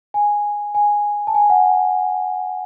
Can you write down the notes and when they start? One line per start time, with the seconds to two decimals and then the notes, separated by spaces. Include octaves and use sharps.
0.14 G#5
0.75 G#5
1.27 A5
1.35 G#5
1.50 F#5